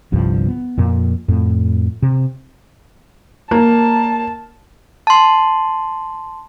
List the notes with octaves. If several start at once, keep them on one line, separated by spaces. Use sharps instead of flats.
G1 C2 G2 F3
B3
F2 A#2
F2 A2
C3
A#3 A5
A5 C6